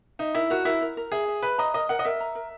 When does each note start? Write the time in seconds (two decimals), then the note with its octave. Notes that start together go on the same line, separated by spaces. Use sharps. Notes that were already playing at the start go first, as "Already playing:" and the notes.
0.19 D#4 E5
0.35 E4 A#4
0.50 F#4 A#4
0.65 E4 A#4
0.81 A#4
0.97 A#4
1.12 G#4 E5
1.28 E5
1.43 B4 E5
1.58 D#5 A#5
1.74 A#4 D#5
1.89 A#4 F#5
1.99 D#5
2.05 A#4 E5
2.21 A#5
2.35 A#4